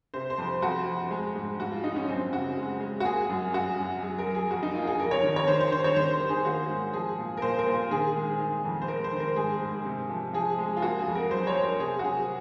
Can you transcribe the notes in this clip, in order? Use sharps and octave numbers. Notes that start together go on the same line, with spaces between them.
C3 C5
C5
F2
F2 F#4
F2
G#3
G#2
G#2 F#4
F4
G#3 D#4
C#4
F#2 C4
C#3 F#4
G#3
G#3
F#4
A#3 G#4
F#2
F#2 F#4
F#2
F#3 G#4
A#4
F#3
G#4
F2 F#4
D#4
A#3 F4
G#4
F2 A#4
C#5
D#3
C#5
D#3 C5
C5
D#3 C5
C#5
D#3 C5
C5
D#3
G#4
A#3 F#4
G#2
F3 G#4
A#2
A#4
A#2 C5
A#4
A#2
D#3 G#4
G#3
D#3
F2
C5
G#3 A#4
C5
D#3
A#4
G#2 G#4
G#2
C3
F3
F3 G#4
G#3
F4
A#3 F#4
G#4
F2
A#4
F#3 C5
C#5
F#3
A#4
C3 G#4
F#4
C3 G#4